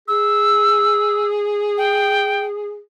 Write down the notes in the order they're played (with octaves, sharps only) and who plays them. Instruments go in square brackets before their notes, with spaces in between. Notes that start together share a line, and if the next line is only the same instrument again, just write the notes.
[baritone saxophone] G#4 [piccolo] E6
[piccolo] G5